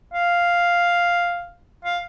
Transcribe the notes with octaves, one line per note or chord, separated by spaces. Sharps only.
F5
F5